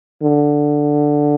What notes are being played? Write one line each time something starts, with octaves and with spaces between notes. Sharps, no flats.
D3